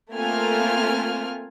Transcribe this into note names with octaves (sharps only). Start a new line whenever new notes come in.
A3 A#3 C4 F4 G#5 F6